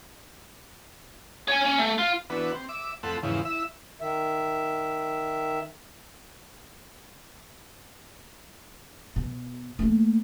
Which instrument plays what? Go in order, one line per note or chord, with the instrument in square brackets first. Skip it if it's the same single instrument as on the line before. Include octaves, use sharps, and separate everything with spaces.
[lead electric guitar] C#5 G#5
C#4
A3
F4
[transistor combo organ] E3 B3 D4 F#4 B4
C4
E5 D6
F2 A3 C4 A4 F#5 B5
E2 G#2 C#3 E3 F3
E4 E5
[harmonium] D#3 E5
[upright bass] B2
A3 A#3